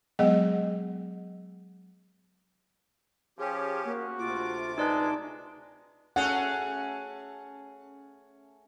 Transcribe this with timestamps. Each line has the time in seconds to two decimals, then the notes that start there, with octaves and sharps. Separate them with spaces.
0.19 F#3 G#3 B3 G#4 D#5 F#5
3.39 F3 C#4 G4 G#4
3.85 A#3 F#4
4.19 D2 C3 F4 D6
4.78 G#3 D#4 B4 D5 A5
6.16 A3 C#4 G#4 F#5